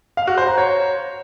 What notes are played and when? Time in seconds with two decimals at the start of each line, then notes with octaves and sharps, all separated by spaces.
0.17 F5
0.27 F#4
0.38 C5
0.48 A#5
0.58 C#5